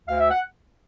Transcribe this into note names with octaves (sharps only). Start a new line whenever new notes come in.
D2 F5
E5
F#5